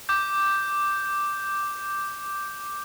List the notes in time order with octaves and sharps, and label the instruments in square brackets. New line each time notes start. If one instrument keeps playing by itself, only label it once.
[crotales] D6 G6